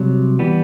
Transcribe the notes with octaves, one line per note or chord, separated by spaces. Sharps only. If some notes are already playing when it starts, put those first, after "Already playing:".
Already playing: C2 C3 F#3
E3 G3 B3